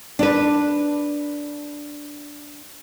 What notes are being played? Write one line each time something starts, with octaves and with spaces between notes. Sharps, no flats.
D4 B4